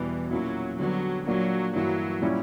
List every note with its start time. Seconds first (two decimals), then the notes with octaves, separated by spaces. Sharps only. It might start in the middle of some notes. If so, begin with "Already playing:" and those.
Already playing: E2 B2 E3 G3
0.31 A#2 F#3 A#3 C#4 E4
0.79 D3 F#3 G3 B3 D4
1.27 A#2 F#3 A#3 D4 F#4
1.75 G2 E3 F#3 A#3 E4
2.22 A#2 G3 C#4 E4